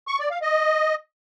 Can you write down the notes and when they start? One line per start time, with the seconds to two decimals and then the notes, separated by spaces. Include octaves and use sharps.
0.08 C#6
0.19 D5
0.30 F5
0.42 D#5